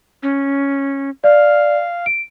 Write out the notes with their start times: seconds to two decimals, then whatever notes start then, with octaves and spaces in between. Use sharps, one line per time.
0.23 C#4
1.24 D5 F5
2.06 D7